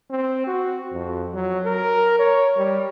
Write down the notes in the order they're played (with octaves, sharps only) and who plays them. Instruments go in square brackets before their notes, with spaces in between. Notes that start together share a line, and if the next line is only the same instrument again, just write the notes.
[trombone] C4
F#4
F2
F#3
A#4
C#5
G3